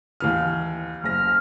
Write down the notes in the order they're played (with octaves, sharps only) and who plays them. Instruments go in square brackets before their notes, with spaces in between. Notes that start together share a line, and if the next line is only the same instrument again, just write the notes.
[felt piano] D#2 E3 F6
[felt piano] F#1 A#6 [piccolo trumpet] F6